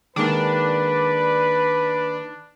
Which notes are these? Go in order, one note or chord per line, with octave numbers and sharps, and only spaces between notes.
D#3 G#3 A#3 D4 B4